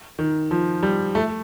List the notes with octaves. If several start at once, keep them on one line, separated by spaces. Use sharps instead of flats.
D#3
F3
G3
A3